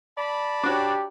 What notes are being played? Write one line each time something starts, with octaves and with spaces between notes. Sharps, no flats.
D5 A5 B5
D4 F#4 G4 C#5